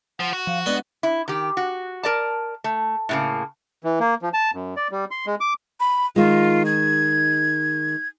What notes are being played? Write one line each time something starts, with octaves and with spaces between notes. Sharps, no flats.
F3 F#5
F#4
F3 F5
G#3 B3 D4 D5 D#5
E4
D#3 G4
F#4
A#4 D5 A5
A3
A2 C#3 A#3
E3
A#3
F3
A5
F#2
D5
G3
C6
G#3
D6
B5
D#3 G#3 F4
G#6